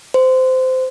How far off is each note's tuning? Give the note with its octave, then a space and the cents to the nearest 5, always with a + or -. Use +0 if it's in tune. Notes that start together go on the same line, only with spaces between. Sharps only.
C5 -20